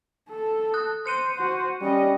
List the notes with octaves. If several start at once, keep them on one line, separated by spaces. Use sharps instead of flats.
A4
D#6 F#6
C5 F#6 C#7 D#7
F#4 C5
G3 C#4 D#5